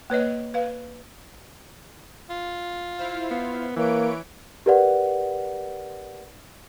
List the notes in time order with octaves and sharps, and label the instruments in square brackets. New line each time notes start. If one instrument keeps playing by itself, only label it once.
[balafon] A#3 B4 C#5 D#5
B4 F5
[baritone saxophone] F4
[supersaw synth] E4 C5 F5
[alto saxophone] B3
[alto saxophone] E3 [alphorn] A#3 [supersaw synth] B4 C#5 D7
[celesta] G4 A#4 B4 D5 F#5